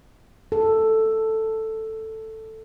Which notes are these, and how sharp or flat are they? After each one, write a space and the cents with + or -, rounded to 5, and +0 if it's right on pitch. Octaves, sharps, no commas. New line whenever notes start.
A4 +5